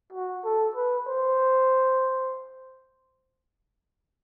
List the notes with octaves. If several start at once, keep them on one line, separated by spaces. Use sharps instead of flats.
F#4
A4
B4
C5